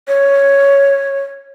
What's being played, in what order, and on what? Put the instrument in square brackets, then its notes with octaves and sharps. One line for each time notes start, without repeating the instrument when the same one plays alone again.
[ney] C#5